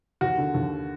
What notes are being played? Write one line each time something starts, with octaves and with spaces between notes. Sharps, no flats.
D#2 F#4
D3
D#2